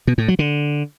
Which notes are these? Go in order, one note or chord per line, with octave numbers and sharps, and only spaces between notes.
B2
A2
F#3
D3